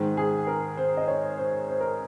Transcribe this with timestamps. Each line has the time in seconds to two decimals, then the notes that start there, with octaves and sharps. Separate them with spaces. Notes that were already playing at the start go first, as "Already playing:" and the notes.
Already playing: G#2 D#3 G#3
0.17 G#4
0.47 A#4
0.77 C5
0.97 D#5
1.08 C#5
1.38 C5
1.68 C5
1.81 A#4